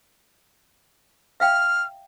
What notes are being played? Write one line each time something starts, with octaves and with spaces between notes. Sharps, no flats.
E5 F5 G5 F6